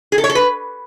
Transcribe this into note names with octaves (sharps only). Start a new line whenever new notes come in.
G#4
A4
C#5
A4
B4